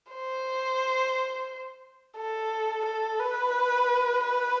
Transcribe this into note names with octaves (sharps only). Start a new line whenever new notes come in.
C5
A4
A4
B4
B4